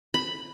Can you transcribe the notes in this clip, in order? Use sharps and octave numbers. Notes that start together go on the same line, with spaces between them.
B5